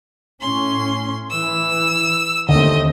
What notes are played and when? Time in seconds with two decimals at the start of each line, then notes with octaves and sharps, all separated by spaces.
0.41 A2 C#4 C6
1.30 E3 E6
2.49 D#2 D3 A3 C4 D#5